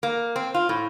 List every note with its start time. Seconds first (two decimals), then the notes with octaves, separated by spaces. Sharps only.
0.03 A#3
0.36 C4
0.54 F4
0.69 A2